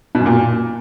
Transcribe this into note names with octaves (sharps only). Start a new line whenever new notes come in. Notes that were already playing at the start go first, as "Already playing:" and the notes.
B2
F#2
A#2